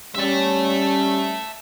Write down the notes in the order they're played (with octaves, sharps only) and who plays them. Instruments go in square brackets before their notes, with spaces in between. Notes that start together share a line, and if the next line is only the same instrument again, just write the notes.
[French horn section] G3 C#4 [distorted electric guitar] E5 A5